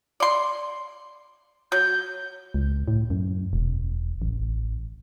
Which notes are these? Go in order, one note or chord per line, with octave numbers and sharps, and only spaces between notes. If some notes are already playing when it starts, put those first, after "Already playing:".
D5 C6
F#3 G6
C#2
A2
F#2
E1
A1